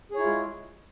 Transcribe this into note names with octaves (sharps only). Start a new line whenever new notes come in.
G#3 E4 F4 G#4 C#5